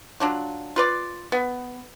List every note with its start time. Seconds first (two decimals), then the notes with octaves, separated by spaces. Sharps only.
0.20 F#3 D4 F4
0.76 F4 B4 D5
1.32 B3